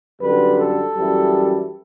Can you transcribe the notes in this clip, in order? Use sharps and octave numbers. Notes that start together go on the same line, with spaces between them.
F#2 D3 G3 B4
A4
F#2 E3 G3